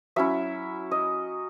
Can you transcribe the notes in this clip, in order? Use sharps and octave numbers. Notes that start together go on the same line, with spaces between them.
F#3 C#4 E4 E5
D#5